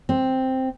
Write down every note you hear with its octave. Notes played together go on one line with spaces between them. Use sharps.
C4